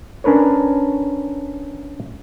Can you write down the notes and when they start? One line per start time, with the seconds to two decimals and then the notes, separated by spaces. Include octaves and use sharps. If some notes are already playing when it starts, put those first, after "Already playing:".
0.24 C#4 D4 A#4 B4 C#5